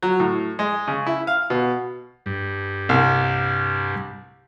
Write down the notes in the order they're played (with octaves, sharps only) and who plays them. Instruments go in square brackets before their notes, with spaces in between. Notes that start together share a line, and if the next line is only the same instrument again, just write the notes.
[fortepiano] F#3
A2
G#3
C#3
E4
F5
B2
[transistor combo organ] G2
[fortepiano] C2